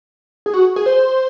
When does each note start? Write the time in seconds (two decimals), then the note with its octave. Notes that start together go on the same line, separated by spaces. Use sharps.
0.46 G#4
0.54 F#4
0.76 G#4
0.86 C5